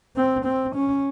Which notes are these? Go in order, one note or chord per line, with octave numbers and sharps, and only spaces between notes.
C4
C4
C#4